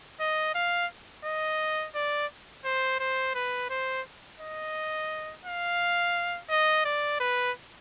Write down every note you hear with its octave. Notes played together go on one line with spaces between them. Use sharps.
D#5
F5
D#5
D5
C5
C5
B4
C5
D#5
F5
D#5
D5
B4